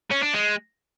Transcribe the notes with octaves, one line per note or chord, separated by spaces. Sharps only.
C#4
D4
G#3